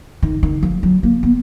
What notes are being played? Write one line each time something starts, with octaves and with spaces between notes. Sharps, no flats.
D#3
D#3
F3
F#3
A#3
B3